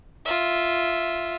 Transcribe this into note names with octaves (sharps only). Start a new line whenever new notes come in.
F4 E5